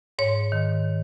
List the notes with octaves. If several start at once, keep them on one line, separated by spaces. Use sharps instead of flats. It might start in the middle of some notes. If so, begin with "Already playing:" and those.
G#2 C#5
D#3